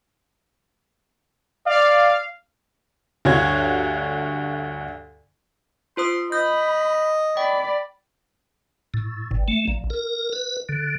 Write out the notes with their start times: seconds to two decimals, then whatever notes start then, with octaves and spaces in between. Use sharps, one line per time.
1.66 D5 F5
3.25 D2 G2 F#4 C#5 F5 G#6
5.97 F4 C5 C6 D#6
6.32 D#5 B5 G6
7.37 D5 G5 B5
8.94 A2
9.31 G1
9.48 A3
9.68 A#1
9.90 A#4
10.33 B4
10.69 D3